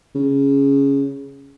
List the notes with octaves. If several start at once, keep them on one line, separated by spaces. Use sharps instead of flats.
C#3